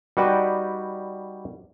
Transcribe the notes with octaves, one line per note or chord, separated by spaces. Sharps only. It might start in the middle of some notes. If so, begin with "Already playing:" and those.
G3 D#4 F#4 B4 D5 G5